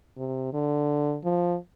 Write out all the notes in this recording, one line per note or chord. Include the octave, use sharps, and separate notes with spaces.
C3
D3
F3